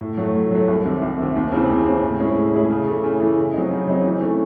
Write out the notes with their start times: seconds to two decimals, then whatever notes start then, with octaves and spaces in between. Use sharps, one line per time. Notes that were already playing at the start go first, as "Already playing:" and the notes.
0.01 A2
0.17 F#3 A3
0.34 A2
0.51 F#3 A3
0.68 C2
0.85 C3 D#3
1.02 C2
1.18 C3 D#3
1.36 D#2
1.52 C#3 E3 C4
1.69 D#2
1.85 C#3 E3 C4
2.02 A2
2.20 G#3 C#4 E4 G#4
2.36 A2
2.54 G#3 C#4 E4 G#4
2.70 C#3
2.87 E3 A3
3.04 C#3
3.20 E3 A3
3.38 C#3
3.54 F#3 C4 D#4
3.71 C#3
3.87 F#3 C4 D#4
4.04 E3
4.21 A3 C#4